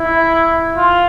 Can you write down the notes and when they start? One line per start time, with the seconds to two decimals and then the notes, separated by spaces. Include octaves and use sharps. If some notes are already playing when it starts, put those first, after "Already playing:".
Already playing: E4
0.77 F4